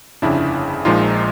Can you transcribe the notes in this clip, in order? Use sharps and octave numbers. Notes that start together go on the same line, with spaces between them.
G1 F2 C#3 D4 E4
A#1 A#2 F3 G#3 D#4 F4